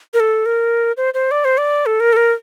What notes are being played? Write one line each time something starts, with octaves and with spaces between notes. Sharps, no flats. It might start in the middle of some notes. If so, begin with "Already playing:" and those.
A#4
A4
A#4
C5
C5
D5
C5
D5
A4
A#4
A4
A#4